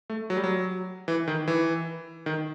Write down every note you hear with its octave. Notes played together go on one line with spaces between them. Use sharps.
A3
F#3
G3
F#3
E3
D#3
E3
D#3